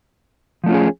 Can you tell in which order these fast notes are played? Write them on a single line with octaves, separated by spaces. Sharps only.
F3 A3 F4 C#4 G#4